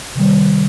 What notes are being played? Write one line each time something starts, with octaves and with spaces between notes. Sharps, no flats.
C3 D#3 G3